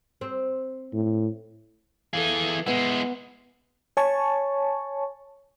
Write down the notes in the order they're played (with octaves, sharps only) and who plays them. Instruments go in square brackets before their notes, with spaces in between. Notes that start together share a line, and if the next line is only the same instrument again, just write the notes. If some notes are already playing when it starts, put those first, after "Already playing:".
[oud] C4
[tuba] A2
[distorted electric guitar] E3 G#4 [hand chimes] A4 F5
[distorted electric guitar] G#3 E4 [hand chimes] B3 B4 F#5
[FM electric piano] C#5 G#5 A5 C#6